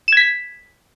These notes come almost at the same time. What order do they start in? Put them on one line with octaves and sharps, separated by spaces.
E7 G#6 B6